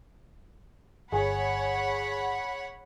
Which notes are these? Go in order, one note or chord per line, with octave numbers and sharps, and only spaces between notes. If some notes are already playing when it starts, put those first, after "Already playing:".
G1 G#4 C#5 F#5 G#5 B5